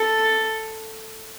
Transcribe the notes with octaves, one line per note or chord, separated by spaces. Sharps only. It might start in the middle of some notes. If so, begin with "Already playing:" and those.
Already playing: A4